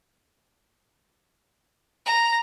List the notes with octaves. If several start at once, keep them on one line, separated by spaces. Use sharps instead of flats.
A#5